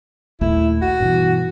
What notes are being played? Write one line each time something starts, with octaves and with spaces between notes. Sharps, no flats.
A#1 D#2 A3 E4
F#4
G2 B2 E3